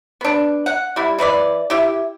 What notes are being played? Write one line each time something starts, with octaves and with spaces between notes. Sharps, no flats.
B3 D4
F#5
G3 E4
E3 B4 C#5 D5
E4 G4